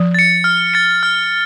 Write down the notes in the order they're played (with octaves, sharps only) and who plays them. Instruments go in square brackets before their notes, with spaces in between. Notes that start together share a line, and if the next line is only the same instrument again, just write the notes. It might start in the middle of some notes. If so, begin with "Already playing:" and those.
Already playing: [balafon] F3
[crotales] A6 C#7
F6
A6 C#7
F6